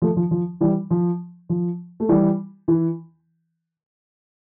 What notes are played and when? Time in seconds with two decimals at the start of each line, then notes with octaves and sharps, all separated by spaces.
0.02 F3 A3
0.17 F3
0.31 F3
0.61 E3 G3
0.90 F3
1.49 F3
2.00 A3
2.09 E3 G3
2.68 E3